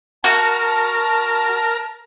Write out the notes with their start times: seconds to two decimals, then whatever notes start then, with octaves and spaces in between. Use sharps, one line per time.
0.24 F#4 A#4 A5